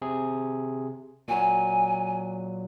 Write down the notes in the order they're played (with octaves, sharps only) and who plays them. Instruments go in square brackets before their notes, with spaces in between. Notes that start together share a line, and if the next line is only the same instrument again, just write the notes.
[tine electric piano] C3 G#4
[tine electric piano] A#2 F#3 [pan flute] G#5